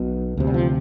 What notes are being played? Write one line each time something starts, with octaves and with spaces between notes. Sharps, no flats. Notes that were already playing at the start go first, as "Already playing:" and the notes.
Already playing: B1 B2
D2 C3
G3
F3